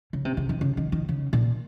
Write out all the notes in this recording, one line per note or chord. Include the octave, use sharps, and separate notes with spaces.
C#3
C3
C#3
D#3
C#3
D#3
D#3
C#3
A#2